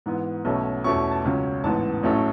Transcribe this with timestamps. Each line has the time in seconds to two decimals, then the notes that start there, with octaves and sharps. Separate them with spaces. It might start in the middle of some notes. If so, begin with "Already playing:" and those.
0.06 G#2 E3 B3
0.45 B1 B2 A3 C#4
0.84 E2 B2 A3 C#4 C#6
1.11 A5
1.24 C#2 C#3 F#3 C#4
1.64 A1 G#2 E3 B3 A5
2.03 A1 A2 F#3 A3 C#4